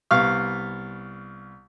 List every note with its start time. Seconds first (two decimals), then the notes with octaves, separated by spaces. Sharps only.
0.11 C2 B3 F5 C#6 F6